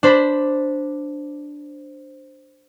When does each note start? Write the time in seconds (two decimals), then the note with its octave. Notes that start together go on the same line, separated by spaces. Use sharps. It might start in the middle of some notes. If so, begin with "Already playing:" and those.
0.03 D4 C5 B5